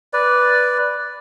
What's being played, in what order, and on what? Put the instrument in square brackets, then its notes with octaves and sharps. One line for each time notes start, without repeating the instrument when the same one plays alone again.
[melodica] B4 D5